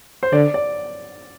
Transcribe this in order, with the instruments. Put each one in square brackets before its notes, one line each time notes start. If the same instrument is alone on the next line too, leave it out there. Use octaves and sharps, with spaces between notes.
[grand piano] C5
[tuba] D3 [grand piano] D5
[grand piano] D5